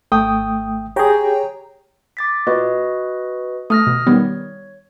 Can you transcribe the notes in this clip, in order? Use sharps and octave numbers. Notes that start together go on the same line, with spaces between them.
G#1 A3 G5 D#6
G4 G#4 C#5 G5 A#5
D6 A6 B6
A#2 F#4 B4 D#5
A3 D#6 F6 A#6
B2
D#3 G3 B3 C#5